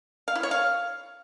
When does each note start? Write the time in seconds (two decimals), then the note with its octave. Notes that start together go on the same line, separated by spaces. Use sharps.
0.28 F5
0.35 E4
0.43 C#5
0.51 F5